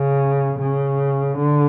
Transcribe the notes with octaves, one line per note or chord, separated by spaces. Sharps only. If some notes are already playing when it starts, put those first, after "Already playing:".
Already playing: C#3
C#3
D3